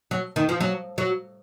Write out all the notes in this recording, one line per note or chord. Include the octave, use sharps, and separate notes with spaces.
F#3
D#3
F3
F#3
F#3